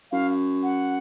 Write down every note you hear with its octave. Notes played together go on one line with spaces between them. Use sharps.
F#2 F5
F#5